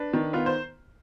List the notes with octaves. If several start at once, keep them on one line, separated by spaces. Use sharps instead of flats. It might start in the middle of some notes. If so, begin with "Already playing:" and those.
Already playing: D4 B4
D#3
B3 F4
C5